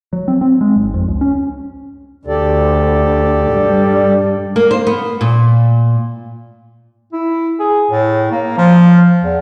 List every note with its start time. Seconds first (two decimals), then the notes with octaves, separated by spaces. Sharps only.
0.13 F#3
0.28 C4
0.41 C4
0.61 G#3
0.76 G#1
0.94 F2
1.08 C#2
1.21 C#4
2.27 D2 G4 A4 D5
3.51 G2 G3
4.56 A#3
4.71 C5
4.87 B3
5.21 A#2
7.12 E4
7.59 G#4
7.91 A2
8.32 A#3
8.58 F3
9.22 E2